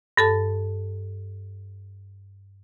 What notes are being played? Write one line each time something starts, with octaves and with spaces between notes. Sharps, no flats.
G2 A4 A5